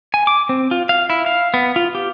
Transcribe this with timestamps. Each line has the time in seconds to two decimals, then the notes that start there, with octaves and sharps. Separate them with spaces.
0.14 G#5
0.27 D6
0.49 C4
0.71 F4
0.89 F5
1.10 E4
1.26 F5
1.54 B3
1.76 F4
1.95 G4